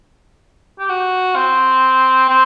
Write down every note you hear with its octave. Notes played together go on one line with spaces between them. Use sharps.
G4
F#4
C4
C4